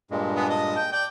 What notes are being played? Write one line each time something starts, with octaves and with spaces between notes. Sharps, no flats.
G2 A#2 G#3
B3 D4 G#4
D#5 A5
G5
D5 G5